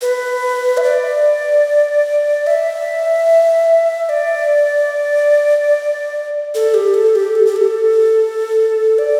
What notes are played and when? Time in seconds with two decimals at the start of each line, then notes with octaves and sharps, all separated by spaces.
0.01 B4
0.77 E5
0.83 D5
2.47 E5
4.09 D5
6.55 A4
6.74 G4
6.94 A4
7.15 G4
7.35 A4
7.47 G4
7.56 A4
8.98 D5